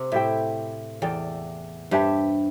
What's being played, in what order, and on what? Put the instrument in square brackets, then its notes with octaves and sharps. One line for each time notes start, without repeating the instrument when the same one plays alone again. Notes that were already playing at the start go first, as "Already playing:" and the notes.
Already playing: [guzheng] C3
[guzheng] A2 [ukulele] E4 G4 E5 G5
[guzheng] E2 [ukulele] A4 D5 G5
[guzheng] G2 [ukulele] G4 C5 E5 A5